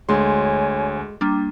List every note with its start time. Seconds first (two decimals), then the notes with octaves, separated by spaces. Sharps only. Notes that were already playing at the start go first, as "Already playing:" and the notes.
0.09 D2 G#3 C#5 G#5 C6
1.21 G3 A#3 D4